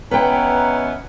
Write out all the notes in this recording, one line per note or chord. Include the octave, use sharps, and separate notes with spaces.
B2 E3 B3 C#4 B4 G5 A#5